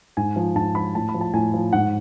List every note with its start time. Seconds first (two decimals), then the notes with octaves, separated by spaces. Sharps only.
0.17 G#2 G#5
0.36 F3
0.55 G#2 A5
0.75 F3 B5
0.95 A2 A5
1.09 B5
1.14 F3
1.21 A5
1.34 A2 G#5
1.54 F3
1.73 G#2 F#5